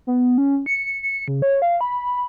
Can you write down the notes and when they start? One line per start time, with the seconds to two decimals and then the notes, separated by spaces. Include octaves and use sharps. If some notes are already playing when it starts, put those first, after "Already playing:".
0.07 B3
0.38 C#4
0.66 C#7
1.03 C#7
1.28 C#3
1.42 C#5
1.62 F5
1.81 B5